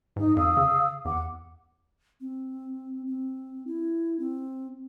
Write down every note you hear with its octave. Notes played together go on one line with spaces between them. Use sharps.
G#2 D#4
F2 F5 D#6 E6
C#3
E2 F#5 D6
C4
C4
E4
C4